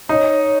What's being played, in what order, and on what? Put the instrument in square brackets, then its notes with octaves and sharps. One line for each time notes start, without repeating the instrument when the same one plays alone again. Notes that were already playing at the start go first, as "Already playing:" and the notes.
[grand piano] D#4 [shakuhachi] C#5